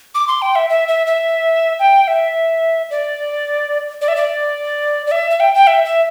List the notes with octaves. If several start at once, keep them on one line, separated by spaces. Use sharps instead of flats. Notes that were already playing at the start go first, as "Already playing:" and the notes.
D6
C6
G5
E5
E5
E5
E5
G5
E5
D5
D5
E5
D5
D5
E5
E5
G5
G5
E5
E5